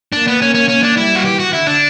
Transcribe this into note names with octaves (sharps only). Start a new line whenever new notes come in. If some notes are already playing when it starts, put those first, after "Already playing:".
A#3 D4
B3
A#3 C#4
C#4
C#4
D4
G3 E4
F#4
E3 G4
F#4
D3 E4
D4